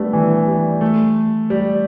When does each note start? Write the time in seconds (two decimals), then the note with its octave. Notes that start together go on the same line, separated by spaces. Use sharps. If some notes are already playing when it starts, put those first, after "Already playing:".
Already playing: G3 A3 B3 D4
0.13 E3
0.47 G3
0.81 A3
1.50 G3